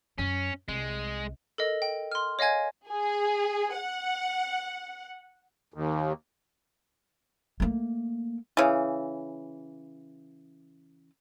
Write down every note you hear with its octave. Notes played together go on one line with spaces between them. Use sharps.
F#2 F#3 C#4
C2 G#3
A4 A#4 D#5
G5
C6 F6
C#5 D#5 F5 G#5 G#6
G#4
F#5
D#2
A3 A#3
C#3 E3